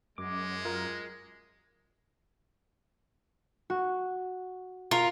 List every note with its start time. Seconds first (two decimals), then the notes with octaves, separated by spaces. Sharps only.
0.18 F#2 G#3 D6
0.65 F4 A#4
3.70 F#4
4.91 F4 A#4 A#5